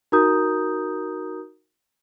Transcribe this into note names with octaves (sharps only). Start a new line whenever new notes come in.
D#4 F#4 A#4 A#5 D#6 G6